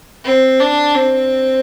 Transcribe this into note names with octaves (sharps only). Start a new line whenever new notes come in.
C4
D4
C4